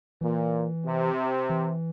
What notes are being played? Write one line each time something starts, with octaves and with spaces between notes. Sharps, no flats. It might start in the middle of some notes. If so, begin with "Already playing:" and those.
A#2 E3
C3
E3